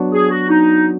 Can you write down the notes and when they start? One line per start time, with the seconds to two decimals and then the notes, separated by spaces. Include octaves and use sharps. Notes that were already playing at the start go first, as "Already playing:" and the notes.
Already playing: F#3 B3 D4 F#4
0.12 G#4
0.31 F#4
0.49 D#4